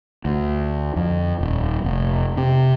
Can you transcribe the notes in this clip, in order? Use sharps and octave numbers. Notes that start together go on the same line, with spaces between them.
D2
F2
D#1
F1
C3